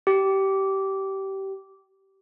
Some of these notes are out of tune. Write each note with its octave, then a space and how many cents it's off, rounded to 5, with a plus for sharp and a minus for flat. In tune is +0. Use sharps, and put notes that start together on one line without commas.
G4 -20